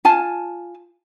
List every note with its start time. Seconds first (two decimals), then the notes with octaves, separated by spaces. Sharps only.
0.05 F4 G#5 A5